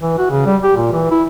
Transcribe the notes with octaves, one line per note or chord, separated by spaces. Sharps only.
E3
F#4
C#3
G3
G4
A#2
E3
E4